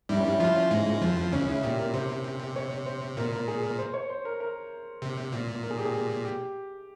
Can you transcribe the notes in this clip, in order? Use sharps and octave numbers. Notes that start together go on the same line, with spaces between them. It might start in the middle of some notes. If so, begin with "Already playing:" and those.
G2 G3 E4
C#4
E4
F3 E4 F4
C#4
G#2 G#3
F4
F2 F3
F4
C#2 C#3 C#4
E4
A#2 G4
A#4
C3 C5
C#5
C5
A#2 A#4
A#4
G#4
A#4
C5
C#5
C5
A#4
A#4
C3
A#2
A#4
G#4
G4
G#4
G4